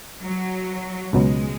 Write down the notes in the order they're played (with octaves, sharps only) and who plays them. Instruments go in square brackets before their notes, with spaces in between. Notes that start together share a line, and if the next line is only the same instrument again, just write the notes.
[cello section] F#3
[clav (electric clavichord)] C#2 B2 F#3 B3 [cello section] G#3